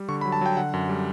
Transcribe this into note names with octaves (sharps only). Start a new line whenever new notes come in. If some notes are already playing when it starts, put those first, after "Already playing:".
Already playing: G3
D3 C#6
B5
F#3
A5
F#3 G5
D3 F#5
F#2
G3